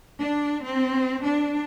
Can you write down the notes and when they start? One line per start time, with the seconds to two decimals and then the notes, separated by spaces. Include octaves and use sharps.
0.20 D4
0.64 C4
1.25 D4